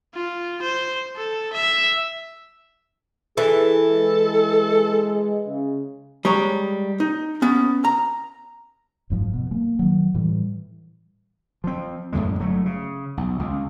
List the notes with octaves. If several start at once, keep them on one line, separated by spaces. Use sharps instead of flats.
F4
C5
A4
E5
E3 G#4 A4
G#3
C#3
G3 G#3 C#5 A#5
D#4
B3 C#4
A#5
F#1 G#2 F3
B2
G#3 A#3
D#3 F#3
A2 E3 G3
F3 C4
F#2 A2 D3 G#3
G1 F#3 A3
C#3
B1
C#2